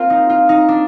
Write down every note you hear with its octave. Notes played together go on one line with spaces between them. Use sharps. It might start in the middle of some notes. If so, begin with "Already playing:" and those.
Already playing: A#3 C4 F4
D#4
F4
D#4
D4